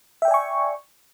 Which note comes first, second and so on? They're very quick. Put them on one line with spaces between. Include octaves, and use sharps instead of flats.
E5 G5 D5 G#5 C#6